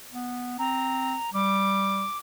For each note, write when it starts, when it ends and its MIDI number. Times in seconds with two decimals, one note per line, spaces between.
0.13 0.56 59
0.59 1.16 60
0.59 1.30 82
1.34 2.05 55
1.34 2.18 86